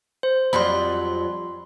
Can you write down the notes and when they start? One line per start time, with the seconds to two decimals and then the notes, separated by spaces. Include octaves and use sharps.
0.23 C5
0.53 F2 F#3 G3 B5 C6